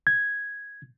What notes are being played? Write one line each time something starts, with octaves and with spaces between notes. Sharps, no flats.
G#6